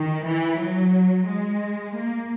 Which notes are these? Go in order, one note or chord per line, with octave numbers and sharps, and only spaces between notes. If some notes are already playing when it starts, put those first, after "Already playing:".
Already playing: D#3
E3
F#3
G#3
A#3